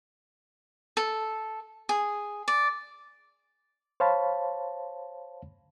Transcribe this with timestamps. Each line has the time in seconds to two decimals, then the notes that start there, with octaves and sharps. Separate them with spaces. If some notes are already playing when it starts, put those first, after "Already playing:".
0.97 A4
1.89 G#4
2.48 D5
4.00 C5 C#5 F5 A5 B5